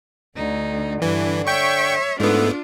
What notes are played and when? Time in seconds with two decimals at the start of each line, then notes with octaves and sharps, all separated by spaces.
0.36 D2 D3 D#4
1.02 G2 E3 D4
1.47 C#5 E5 G5 C#6
2.20 G#2 A3 B3 D4 F4 A4